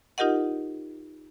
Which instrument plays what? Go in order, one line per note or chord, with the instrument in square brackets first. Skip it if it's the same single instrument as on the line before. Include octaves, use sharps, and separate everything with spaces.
[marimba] D#4 F4 G4 A#4 D#5 F#5